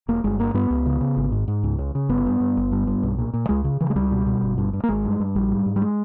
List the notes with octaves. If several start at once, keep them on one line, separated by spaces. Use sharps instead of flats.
E1 A#3
G1 G#3
G2 A#3
G2 B3
C#2
C#3
C#3
G#1
G#2
G#2
C#2
C#3
C#3
G1 B3
G2
G2
G1
G2
G2
B1
A#2
A#2
C#2 G#3
C#3
C#3 E3
G#3
C#2 G3
B2
B2
G1
G2
G2
A#3
G#1 G#3
G2
G2
A#1 G3
G#2
G#2
G3
G#3